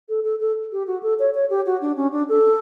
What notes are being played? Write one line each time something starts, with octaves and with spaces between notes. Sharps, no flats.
A4
A4
A4
G4
F#4
A4
C#5
C#5
G4
F#4
D4
C#4
D4
A4